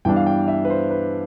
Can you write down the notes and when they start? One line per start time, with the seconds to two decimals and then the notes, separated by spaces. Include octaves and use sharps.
0.05 G2 E3 G3 B3 D4 G5
0.16 F5
0.27 G5
0.48 E5
0.65 B4
0.70 C5
0.91 B4